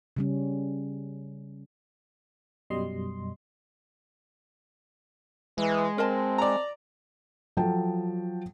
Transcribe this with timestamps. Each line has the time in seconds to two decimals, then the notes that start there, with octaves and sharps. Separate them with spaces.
0.17 C#3 G3 C#4
2.70 F#2 B2 G3 D#5 C6
5.58 E3 G#3
5.98 C4 A#4 D#5 A5
6.38 D5 A#5
7.57 F3 F#3 A4 G5 A5